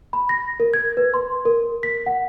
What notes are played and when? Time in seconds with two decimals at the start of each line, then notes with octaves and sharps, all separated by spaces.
0.13 B5
0.29 A#6
0.60 A#4
0.74 G#6
0.97 B4
1.14 C6
1.45 A#4
1.83 B6
2.06 F#5